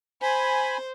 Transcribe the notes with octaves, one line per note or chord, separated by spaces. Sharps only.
C5 G#5 B5